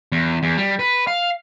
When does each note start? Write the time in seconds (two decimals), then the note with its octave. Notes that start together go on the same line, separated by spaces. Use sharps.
0.12 E2
0.43 E2
0.57 G3
0.79 B4
1.07 F5